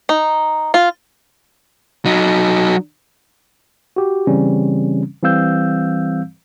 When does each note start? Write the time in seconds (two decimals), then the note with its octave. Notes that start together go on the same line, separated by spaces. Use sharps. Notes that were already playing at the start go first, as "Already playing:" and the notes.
0.09 D#4
0.74 F4
2.05 F#3 D#4
3.96 F#4 G4
4.27 C#3 E3 G3 C4 C#4
5.23 E3 G3 C4 F5 E6 G6